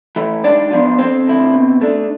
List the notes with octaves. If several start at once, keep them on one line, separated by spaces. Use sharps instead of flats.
E3 A3
G#2 D4 D5
F3 B3 D4 F4
F2 C4 C5
D3 A3 E4
B2
A3 D4